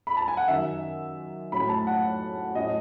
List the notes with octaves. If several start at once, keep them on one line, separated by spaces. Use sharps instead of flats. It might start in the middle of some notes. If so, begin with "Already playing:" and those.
B5
A5
G#5
F#5
F#2 D#3 F#3 E5
A2 F#3 C#4 B5
A5
F#5
A2 F#3 C#4 D#5